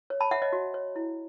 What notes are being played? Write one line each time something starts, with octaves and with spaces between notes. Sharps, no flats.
C#5
A5 B5
C#5 E5 F#5
C#5 D#5
F#4
C#5
E4